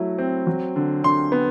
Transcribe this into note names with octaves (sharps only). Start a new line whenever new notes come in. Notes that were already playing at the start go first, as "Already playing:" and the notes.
Already playing: F#3 A3 E4
C4
F#3
D3
D3 C6
B3